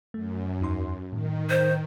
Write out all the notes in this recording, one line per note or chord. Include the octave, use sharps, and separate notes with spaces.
F#2 A3
E2 D#4 C6
A2 D#3
C5